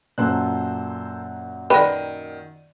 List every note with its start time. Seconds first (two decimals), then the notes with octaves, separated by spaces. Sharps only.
0.18 F#2 A#2 A4 C5 F#6
1.70 D#3 B4 D5 G5 D#7